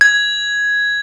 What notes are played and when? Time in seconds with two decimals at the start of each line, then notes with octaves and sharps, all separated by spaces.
0.01 G#6